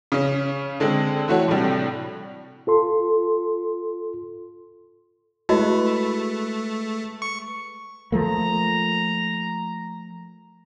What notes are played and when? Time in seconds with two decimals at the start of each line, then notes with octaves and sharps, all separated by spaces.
0.12 C#3 C#4
0.80 D3 G#3 C4
1.28 E3 A3 F#4 C#5
1.48 A2 C3 G3 D4
2.67 F4 A4 C6
5.49 G#3 A3 E4 F#4 B4 D#5
7.22 C#6
8.12 F3 A3 A#3 A#5